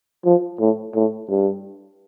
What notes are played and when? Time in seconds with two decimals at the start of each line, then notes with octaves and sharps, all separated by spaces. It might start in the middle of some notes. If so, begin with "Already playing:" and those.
0.25 F3
0.60 A2
0.95 A2
1.30 G2